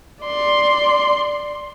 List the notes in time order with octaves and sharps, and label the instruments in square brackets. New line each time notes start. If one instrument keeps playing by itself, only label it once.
[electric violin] D5 C6